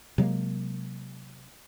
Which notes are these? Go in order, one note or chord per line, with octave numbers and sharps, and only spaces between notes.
C3 F#3 G#3 A#3